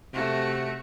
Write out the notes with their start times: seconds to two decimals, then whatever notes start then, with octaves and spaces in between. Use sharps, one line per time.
0.14 C3 A3 F#4